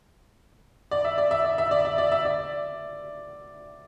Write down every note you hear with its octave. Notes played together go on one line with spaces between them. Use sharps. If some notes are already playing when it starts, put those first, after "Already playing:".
D5
E5
D5
E5
D5
E5
D5
E5
D5
E5
D5